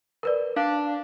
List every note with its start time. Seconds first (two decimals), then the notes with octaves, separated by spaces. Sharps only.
0.23 A#4 B4 D5
0.56 D4 F5